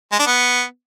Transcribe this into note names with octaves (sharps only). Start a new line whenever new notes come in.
G#3
D4
B3